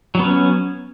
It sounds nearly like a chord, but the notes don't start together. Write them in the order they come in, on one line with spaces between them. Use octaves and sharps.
F#3 B3 C#4